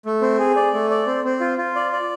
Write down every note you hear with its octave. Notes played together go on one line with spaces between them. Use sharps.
A3
C4
G#4
D5
A3
D5
C4
C4
F4
F4
D5
D5